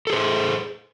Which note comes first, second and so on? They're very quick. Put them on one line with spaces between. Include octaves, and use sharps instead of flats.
A4 G#4 C5